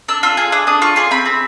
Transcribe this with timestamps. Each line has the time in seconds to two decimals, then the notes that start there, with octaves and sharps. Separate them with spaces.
0.08 D4 E6
0.23 F4 E6
0.37 G#4
0.52 D4 D#6
0.67 D4 D#6
0.82 F4 C#6
0.96 G#4 C6
1.11 C4 B5
1.26 C4